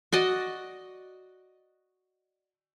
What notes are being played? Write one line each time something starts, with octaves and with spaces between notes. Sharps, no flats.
F#4 D5 D#5